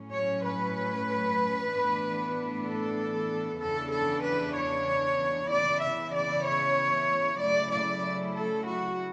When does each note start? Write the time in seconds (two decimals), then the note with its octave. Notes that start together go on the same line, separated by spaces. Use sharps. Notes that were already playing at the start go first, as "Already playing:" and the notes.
Already playing: A2 F#3 C#4
0.13 C#5
0.44 B4
1.70 A2 E3 B3 D4
2.65 A4
3.60 E2 C#3 E3 B3 D4 A4
3.92 A4
4.23 B4
4.55 C#5
5.50 C#3 E3 B3 E4 D5
5.82 E5
6.13 D5
6.45 C#5
7.39 C#3 F#3 A3 E4 D5
7.71 D5
8.35 A4
8.66 F#4